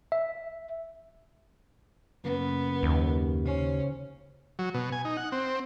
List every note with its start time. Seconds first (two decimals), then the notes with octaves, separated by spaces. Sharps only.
0.12 E5
2.24 F#2 C#3 A#3 B3
2.83 D#2
3.45 C#3 C#4 C5 C#5
4.59 F#3
4.74 B2
4.92 G#5
5.05 D#4
5.17 F#5
5.32 C4